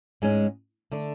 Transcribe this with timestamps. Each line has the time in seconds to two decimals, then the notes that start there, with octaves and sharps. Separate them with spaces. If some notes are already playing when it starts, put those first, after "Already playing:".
0.22 G#2 G#3 C#4
0.92 D3 A3 D4